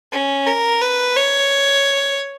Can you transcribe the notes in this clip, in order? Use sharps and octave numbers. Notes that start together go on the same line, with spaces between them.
C#4
A#4
B4
C#5